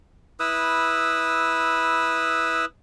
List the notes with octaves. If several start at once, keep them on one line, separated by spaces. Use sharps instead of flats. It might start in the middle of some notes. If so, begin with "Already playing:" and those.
E4 B4 D#6 E6